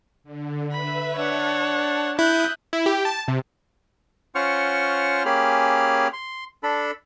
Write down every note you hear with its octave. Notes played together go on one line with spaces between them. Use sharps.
D3
B4 E5 B5
D4 C#5 F#5 A5
E4 E5 D#6 F#6 G6
E4
G4
A5
C3
C#4 F4 C5 F#5 C#6 F6
A#3 C#4 G4 G#4 B5 F6
C6
D4 A4 B5